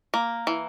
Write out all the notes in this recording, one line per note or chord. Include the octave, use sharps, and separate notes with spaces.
A#3
E3